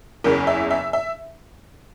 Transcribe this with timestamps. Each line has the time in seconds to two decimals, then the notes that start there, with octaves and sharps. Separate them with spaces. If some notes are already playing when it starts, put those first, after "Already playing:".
0.24 F#1 E2 C#3 A#4
0.47 E5
0.70 E5
0.93 E5